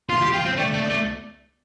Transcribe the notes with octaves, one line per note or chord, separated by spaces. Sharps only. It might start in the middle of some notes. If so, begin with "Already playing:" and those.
F4 C6
G4
F4 G5
C4
A3 D5
A3
A3